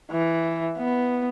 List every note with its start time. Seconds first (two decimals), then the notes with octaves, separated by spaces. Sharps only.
0.11 E3
0.78 B3